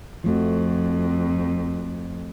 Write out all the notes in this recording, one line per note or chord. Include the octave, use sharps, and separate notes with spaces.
F2 F3 A3 F#4